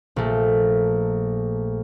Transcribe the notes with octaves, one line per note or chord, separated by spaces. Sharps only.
A#1 A3